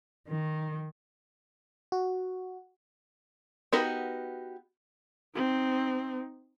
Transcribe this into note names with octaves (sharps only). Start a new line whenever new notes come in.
D#3
F#4
B3 D#4 F#4 G4 A#4
C4 D#4